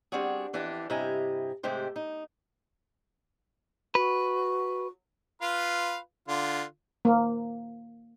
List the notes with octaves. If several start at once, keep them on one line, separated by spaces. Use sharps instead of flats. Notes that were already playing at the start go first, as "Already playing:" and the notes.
G3 C4 D4 F#4 G#4
F2 E3 D4 G4 A5
G2 C3 E4 D#5 G#5 A#5
G#2 C3 G#3 A3 G4 C5
D#4
F#4 B4
F4 B4 F5
D3 F4
A#3